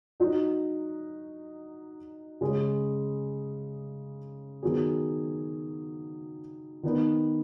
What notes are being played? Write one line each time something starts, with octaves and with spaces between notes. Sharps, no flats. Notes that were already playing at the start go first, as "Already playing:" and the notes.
F#3 D#4 F#4
C#3 G#3 C#4
D#3 F#3 B3 G#4
D#3 B3 D#4